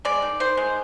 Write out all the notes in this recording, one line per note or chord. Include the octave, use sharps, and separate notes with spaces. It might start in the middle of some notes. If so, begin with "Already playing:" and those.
G#3 D5
D#3
D#3 C5
G#3